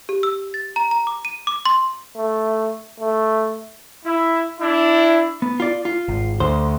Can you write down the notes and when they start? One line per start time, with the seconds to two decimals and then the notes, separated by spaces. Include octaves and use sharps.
0.09 G4
0.23 E6
0.54 A6
0.76 A#5
0.91 A#5
1.07 D6
1.25 D#7
1.47 D6
1.66 C6
2.16 A3
3.01 A3
4.05 E4
4.61 D4 E4
5.42 B3
5.60 F4 D5
5.85 F4
6.08 G#1
6.40 D2 C5